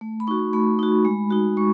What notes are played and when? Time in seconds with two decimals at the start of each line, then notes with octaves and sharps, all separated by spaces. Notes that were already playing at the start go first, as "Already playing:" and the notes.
0.01 A3
0.20 B5
0.27 D#4 F#4 C#6
0.53 A3 B5
0.79 D#4 F#4
1.05 G#3
1.31 D#4 F#4
1.57 G#3 C#6